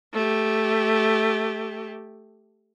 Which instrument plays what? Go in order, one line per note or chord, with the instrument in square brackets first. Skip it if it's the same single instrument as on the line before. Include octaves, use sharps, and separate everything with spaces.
[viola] A3 G4